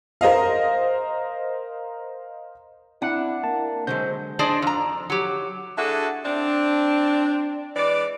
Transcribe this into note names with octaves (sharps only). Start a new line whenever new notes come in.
A#4 C5 D#5 F5
C4 D4 E4 F#5
A#3 A5
D3 F#3 G#3 C5 G6
D4 G#4 C5 D5 D#5
F2 A#5
F#3 G4
D4 E4 F#4 G#4 A4
C4 D4
E3 G#3 D5